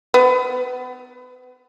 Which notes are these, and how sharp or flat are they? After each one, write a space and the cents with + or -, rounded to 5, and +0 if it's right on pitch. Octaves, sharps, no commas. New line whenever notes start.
B3 +35